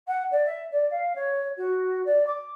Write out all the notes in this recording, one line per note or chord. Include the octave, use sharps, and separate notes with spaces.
F#5
D5
E5
D5
F5
C#5
F#4
D5
D6